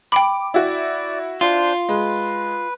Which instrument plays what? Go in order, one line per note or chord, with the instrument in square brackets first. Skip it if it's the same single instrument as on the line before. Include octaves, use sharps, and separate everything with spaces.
[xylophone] G5 B5 [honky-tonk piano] D6 D7
[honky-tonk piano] E4 F#4 [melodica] D5
[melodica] D4 C5 [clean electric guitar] F4
[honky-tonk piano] G#3 [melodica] B4